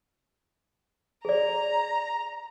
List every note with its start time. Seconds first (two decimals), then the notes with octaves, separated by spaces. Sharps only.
1.25 G#4 D5 A#5